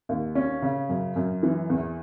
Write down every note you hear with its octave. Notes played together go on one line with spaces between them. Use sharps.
D#2
C#4
C#3
F#2
F#2
E3
E2